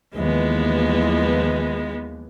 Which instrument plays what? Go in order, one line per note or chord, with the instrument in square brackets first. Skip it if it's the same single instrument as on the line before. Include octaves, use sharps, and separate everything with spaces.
[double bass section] D#2 E3 F3 [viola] G#3 B3